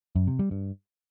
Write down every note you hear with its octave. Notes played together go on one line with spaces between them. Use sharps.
F#2
C3
G3
G2